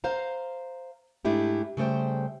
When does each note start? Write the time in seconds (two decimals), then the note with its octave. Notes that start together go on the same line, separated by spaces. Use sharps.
0.04 C5 F5 A#5
1.25 G#2 A3 D4 E4 G4
1.77 C#3 G3 A3 C5 G5